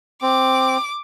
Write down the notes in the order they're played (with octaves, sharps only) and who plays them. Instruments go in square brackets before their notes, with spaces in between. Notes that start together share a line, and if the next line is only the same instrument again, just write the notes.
[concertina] C4 [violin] D6